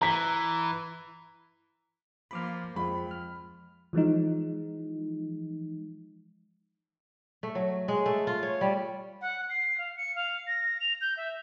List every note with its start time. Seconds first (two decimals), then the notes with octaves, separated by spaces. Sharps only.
0.02 E3 A#5 B6
2.31 F3 A#3 B5 D6 F6
2.76 F2 F3 G#3 B5
3.11 F6
3.93 E3 F3 G#3 D#4
7.43 A3
7.55 F#3
7.88 G#3
8.06 A3
8.27 F4
8.43 C#5
8.61 G3
9.21 F#5
9.50 C7
9.78 F5
9.97 C#7
10.15 F5
10.47 A#6
10.81 F7
11.01 G6
11.17 E5